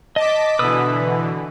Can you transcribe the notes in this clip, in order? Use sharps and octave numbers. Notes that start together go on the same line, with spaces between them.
D#5 A5 D6 B6
B2 D3 E3 B4 D#6 E6